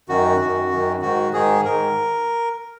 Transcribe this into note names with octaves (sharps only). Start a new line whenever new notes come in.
F#2 D#3 F#4
F#2 D#3
F#2 D#3
G#2 D#3 F#4
G#2 D#3 G#4
G#2 D#3 A#4